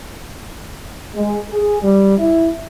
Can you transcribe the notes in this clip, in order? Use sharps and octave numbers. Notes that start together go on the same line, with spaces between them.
G#3
G#4
G3
E4